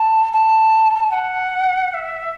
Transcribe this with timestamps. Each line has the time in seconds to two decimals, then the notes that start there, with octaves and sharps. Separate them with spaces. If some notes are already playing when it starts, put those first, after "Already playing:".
Already playing: A5
0.32 A5
1.11 F#5
1.89 F#5
1.93 E5